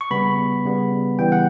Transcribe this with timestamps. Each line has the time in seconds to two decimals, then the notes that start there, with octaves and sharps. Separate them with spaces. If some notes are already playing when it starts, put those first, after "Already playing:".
0.01 C#6
0.11 C#3 G3 B3 B5
0.65 C#3 G3 B3
1.19 C#3 E3 G3 B3 G5
1.32 F#5